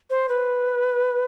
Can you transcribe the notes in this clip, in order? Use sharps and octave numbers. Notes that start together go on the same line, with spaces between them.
C5
B4